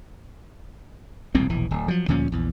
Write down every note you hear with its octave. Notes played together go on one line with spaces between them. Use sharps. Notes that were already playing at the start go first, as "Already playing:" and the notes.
E1 C2 A#2 C4
E1 A#1 E3
D1
F3 F#3
D2 A#2 F3 C#4
A#1 E2